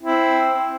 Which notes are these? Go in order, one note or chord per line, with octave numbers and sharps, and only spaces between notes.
C4 E4